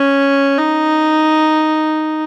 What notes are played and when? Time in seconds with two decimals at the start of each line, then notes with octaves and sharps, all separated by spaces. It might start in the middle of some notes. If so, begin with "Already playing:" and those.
Already playing: C#4
0.58 D#4